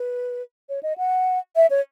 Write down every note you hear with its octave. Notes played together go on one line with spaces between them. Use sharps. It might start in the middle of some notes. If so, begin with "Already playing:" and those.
Already playing: B4
C#5
D#5
F#5
E5
C#5